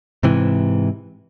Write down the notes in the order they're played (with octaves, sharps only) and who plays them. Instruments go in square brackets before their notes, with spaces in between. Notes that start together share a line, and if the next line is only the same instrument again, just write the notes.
[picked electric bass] G#2 C3 E3